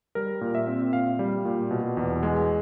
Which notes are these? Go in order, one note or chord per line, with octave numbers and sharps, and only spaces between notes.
G3 A#4
A#2
E5
C4
A#2 F5
G3
A#2
B2
E2
G#3